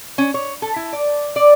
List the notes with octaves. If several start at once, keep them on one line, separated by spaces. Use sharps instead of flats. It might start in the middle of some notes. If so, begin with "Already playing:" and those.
C#4
C#5
A4
E4
D5
D5